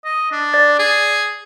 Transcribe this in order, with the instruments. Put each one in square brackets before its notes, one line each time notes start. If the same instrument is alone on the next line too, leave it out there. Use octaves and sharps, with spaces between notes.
[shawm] D#5
D4
[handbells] D5 A6
[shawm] G#4